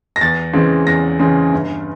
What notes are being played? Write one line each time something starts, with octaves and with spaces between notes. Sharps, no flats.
A#6
E2 A6
C#3 E3 G#3 C4
E2 A#6
C#3 E3 G#3 C4
G1